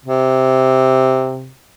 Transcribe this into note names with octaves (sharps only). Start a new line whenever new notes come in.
C3